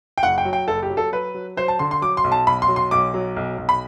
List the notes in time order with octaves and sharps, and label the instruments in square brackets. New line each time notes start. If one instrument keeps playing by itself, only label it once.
[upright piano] G5
F#1 F#5
G5
F#3
G5
F#1 A4
G4
F#3
A4
F#3 B4
F#3
F#3 C5
A5
D3 C6
C6
F#3 D6
C6
B1
A5
B1 B5
C6
F#3
C6
B1 D6
F#3
B1
B1
B5